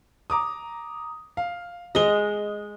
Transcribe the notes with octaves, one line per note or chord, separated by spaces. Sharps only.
A#5 D6 D#6
F5
G#3 D#5 D#6 G7